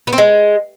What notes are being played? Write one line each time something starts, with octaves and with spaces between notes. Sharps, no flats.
B3
C4
G#3